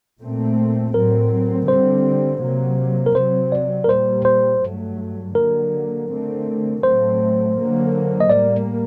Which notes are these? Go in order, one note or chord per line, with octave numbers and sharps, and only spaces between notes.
A#2 A3 C4
A2 F#3 C4 A#4
D3 G3 C4 C5
C3 F#3 A#3
A#4
C3 F#3 C4 C5
D5
A#4
A#2 G3 A#3 C5
C5
G2 F#3 A3
D3 F#3 A#3 A#4
D3 A3 C4
A2 F#3 A3 C4 C5
D3 F#3 A#3
D#5
A2 G3 A#3 D5